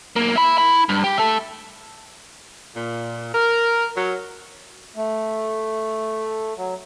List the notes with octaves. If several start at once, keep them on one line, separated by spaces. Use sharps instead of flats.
B1 A#3
E5 B5
E4 B5
G2
G4
A4 E5
A#2
A#4
F#3
A3
F#3